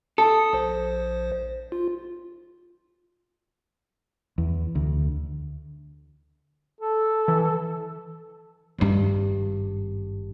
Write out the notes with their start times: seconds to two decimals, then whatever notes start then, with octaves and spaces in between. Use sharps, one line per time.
0.18 A4 D#6
0.53 A#1 C5
1.72 F4
4.38 E2
4.75 D2
6.81 A4
7.28 E3
8.78 G#1 G2